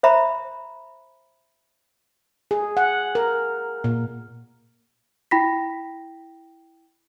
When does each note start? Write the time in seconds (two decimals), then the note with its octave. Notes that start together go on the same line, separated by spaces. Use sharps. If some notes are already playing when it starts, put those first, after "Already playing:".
0.03 C5 E5 A#5 B5
2.51 G#4
2.77 F#5
3.15 A#4
3.84 A#2
5.31 E4 G5 B5 A#6 B6